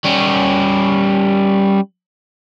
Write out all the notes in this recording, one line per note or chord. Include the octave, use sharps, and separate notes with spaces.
G3 C#4